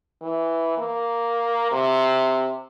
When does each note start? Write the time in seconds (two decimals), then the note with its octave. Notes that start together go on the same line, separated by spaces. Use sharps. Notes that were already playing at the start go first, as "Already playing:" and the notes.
0.22 E3
0.78 A#3
1.72 C3